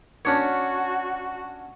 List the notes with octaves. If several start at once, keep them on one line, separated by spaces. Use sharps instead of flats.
C#4 D4 F#4 C#5